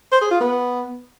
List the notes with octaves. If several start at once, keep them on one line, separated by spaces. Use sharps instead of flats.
C5
G#4
F4
B3